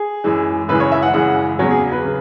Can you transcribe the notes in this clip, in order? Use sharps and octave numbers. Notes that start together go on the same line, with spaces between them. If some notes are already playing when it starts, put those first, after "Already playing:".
Already playing: G#4
F#2 E3 G#3
F#2 C#3 E3 G#3 B4
C#5
E5
F#5
F#2 C#3 E3 G#3 F#5
E2 C#3 F#3 C#5
G#4
B4
C#3